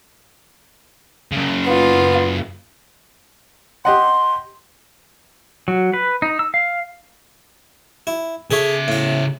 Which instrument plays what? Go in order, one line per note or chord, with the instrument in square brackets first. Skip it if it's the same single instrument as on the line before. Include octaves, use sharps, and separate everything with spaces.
[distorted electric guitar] F#2 C#3
[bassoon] B3 [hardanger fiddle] F4
[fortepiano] G4 D#5 F#5 [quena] C6
[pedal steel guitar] F#3
B4
D#4
E6
F5
[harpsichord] E4
[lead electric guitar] C#3 E5 [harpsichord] G#4 A4 C#5
[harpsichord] A2 F5